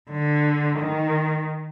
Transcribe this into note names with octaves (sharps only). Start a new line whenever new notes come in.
D3
D#3